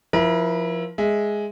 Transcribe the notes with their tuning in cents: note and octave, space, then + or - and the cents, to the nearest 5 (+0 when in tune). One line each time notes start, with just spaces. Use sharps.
F3 +0 E4 +0 A#4 +40
G#3 +0 E5 +0